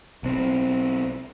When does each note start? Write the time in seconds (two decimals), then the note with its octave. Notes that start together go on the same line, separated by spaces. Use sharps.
0.23 B1 C4